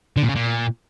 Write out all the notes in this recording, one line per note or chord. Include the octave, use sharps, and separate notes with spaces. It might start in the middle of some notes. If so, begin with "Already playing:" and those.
D3
A#2
C#3
A#2